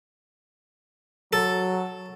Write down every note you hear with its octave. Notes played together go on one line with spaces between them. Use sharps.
F#3 A4